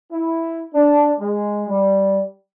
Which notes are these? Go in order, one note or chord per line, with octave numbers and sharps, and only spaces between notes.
E4
D4
G#3
G3